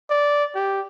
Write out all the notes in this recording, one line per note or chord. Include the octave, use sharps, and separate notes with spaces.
D5
G4